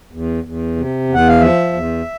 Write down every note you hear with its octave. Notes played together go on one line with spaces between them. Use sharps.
E2
E2
C3
E2
F#5
F5
F3 E5
E2